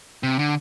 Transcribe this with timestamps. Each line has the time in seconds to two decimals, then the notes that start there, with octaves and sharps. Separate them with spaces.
0.23 C3
0.39 D3